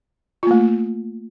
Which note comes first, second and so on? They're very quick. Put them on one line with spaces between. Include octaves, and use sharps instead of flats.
F4 A#3 A3